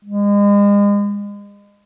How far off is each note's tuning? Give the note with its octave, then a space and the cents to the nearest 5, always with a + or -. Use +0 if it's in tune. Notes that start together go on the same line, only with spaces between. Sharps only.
G#3 -35